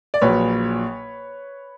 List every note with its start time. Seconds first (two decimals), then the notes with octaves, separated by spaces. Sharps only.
0.14 D5
0.21 A#1 A#2 F#3 B4 C#5